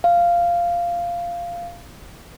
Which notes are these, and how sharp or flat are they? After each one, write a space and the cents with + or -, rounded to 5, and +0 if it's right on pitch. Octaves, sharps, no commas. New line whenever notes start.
F5 -10